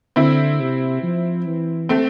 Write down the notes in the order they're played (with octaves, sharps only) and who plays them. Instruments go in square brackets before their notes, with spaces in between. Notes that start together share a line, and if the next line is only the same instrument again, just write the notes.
[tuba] D3 [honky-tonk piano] C4 E4
[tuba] C3
F3
E3
[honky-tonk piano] A3 C4